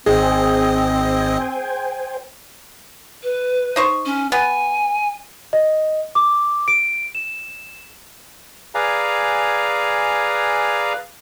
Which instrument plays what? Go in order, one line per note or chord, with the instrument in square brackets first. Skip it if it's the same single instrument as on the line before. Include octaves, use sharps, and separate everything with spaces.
[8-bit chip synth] G#1 D#5 [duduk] C4 [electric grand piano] G#4 [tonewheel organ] C5 G5 G#5
[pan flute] B4
[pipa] D#4 C5 C#6
[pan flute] C#4
[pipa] B3 [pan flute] G#5
[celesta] D#5
D6
D7
E7
[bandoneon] G#4 B4 D5 F5 G#5 A#5